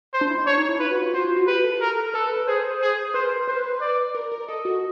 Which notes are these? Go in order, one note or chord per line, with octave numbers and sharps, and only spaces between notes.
C5
D4
E4
D#4
D4 C#5
D#4
E4
F4 B4
F#4
F4
F#4 C5
F4
F#4
G4 B4
A4
A#4
A4 B4
B4
B4
G#4 C5
G#4
B4 C5
A#4
B4 C5
D5
A#4
A#4
A4 D#5
F#4